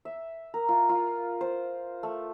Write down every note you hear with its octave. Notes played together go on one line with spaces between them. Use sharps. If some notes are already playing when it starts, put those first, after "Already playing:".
E5
A#4
F4
F4
C5
A3